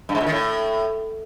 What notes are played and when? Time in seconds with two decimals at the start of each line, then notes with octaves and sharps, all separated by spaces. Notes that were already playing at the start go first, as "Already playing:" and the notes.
0.09 G2
0.15 G#2
0.21 A#2
0.26 D#3
0.32 A2